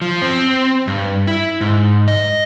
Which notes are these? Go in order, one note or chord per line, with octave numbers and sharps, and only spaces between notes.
F3
C4
G2
E4
G#2
D#5